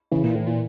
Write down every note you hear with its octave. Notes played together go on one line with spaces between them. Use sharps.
C#3 E3
A#2
A2 E3
A#2